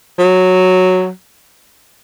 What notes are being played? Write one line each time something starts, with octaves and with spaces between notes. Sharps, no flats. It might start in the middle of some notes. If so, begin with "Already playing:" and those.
F#3